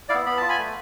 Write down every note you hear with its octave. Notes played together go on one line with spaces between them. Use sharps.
E4 D5 F5
B3
B3 B5
F4 A5
G#5 B5
A3